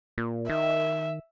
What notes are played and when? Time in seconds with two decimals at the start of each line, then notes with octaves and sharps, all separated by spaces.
0.18 A#2
0.50 D#3 E5